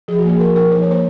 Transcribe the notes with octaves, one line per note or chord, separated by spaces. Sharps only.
F3 G#4
F#4
A#3 G#4
F3 A#4
D#4 A#4
F3 C5
C#5
A#3 C5